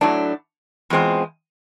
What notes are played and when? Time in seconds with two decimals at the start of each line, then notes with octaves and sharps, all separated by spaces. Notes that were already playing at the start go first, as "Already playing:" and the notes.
0.01 A2 F#3 A3 D4
0.90 E2 B2 G#3 C4 F4